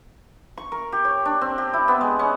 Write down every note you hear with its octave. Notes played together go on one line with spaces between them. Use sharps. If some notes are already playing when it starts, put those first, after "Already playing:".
C#6
A#4
G4
C#5
D4
C4
G4
E4
B3
G#3
C#4